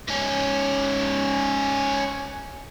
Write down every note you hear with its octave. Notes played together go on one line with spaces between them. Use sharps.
G#2 C#4